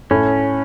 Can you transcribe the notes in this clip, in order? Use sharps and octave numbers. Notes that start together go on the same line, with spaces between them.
A2 C#4